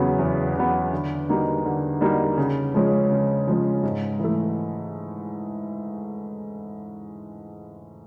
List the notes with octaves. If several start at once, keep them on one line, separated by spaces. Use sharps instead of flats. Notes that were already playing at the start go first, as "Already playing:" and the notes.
Already playing: E2 C#3 F#3 B3
E2
C#3 F#3 B3
D3
G3 A#3 D#4 F#4
D3
G3 A#3 D#4 F#4
C#3
F3 G#3 C#4
C#3
F3 G#3 C#4
G#2
E3 A3